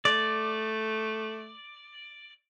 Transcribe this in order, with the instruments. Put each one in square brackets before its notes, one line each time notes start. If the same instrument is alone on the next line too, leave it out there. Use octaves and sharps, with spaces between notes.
[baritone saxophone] A3 [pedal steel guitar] D5